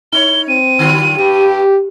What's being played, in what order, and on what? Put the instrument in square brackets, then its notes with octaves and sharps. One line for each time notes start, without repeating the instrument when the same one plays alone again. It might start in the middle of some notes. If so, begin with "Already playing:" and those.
[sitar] D#4 C#5 [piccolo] G7
[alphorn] C4 [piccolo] D#7
[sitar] D3 F#3 F4
[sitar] G2 [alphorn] G4